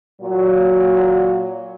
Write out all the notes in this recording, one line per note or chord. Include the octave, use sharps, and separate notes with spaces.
A#2 F#3